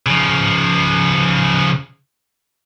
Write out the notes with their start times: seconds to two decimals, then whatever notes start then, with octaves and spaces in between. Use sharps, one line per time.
0.06 C#3 F3